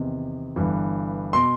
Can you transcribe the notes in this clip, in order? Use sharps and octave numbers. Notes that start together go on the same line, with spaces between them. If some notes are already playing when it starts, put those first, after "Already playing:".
Already playing: E2 C3 D#3
G1 G2 E3
B2 C6